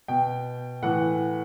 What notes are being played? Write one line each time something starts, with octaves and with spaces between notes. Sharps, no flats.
B2 G5
A2 E3 F#5